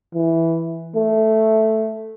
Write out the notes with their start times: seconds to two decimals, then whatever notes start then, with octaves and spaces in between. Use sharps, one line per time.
0.15 E3
0.96 A3